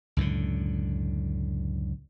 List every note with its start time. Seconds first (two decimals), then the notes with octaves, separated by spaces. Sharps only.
0.17 C#2 F#2 A2 D3